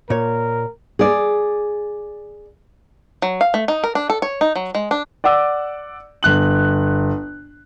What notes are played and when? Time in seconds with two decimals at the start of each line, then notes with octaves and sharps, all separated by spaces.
0.10 A#2 A#4 C#5
0.99 G#4 D5
3.22 F#3
3.41 F5
3.54 A3
3.68 D#4
3.84 A#4
3.95 D4
4.10 A4
4.22 C#5
4.41 D#4
4.56 F#3
4.75 G#3
4.91 D4
5.24 D5 F#5 D6 E6
6.23 G1 F#6 F#7